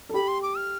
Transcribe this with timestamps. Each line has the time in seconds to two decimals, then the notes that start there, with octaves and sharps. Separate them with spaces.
0.09 A4
0.14 G4 B5
0.28 C6
0.42 D6
0.57 F6